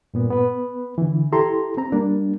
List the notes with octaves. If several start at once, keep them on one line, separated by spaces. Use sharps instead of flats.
G2 A#2 B3
B3 B4
D3 E3
E4 G4 A4 A#5 C6
C4 A#5
G3 A#3 D4